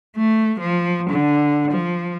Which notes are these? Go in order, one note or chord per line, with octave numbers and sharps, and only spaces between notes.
A3
F3
D3
F3